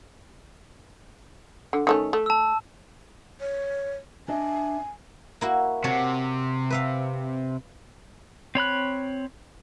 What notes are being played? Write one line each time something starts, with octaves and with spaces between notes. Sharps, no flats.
D3
D#3 A3 C#4
A3
A5 E6
C#5
D4 D#5 E5 G#5
A#3 E4 F#4
C3 F#4 C#5 A5
B4 E5 F5
C4 C#5 B5 F#6